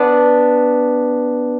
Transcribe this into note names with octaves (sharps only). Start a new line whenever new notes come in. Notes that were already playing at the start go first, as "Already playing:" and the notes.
Already playing: B3 D4